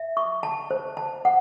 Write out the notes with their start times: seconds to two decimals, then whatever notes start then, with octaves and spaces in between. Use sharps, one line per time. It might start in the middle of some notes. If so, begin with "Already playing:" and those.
Already playing: E5
0.17 C#6
0.43 A5
0.71 C5
0.97 A5
1.25 F#5